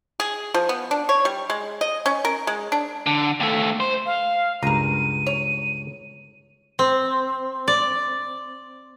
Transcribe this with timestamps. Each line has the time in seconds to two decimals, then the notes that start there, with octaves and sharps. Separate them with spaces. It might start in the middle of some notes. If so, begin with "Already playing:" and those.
0.20 G#4
0.54 F3
0.69 B3
0.91 D4
1.09 C#5
1.25 G3
1.50 G#3
1.81 D#5
2.06 C#4
2.25 A#4
2.47 G#3
2.72 D4
3.06 D3
3.40 D#2 A3
3.80 C5
4.06 F5
4.63 C#2 G2 A#4 A#5 D#7
5.27 C#5
6.79 C4
7.68 D5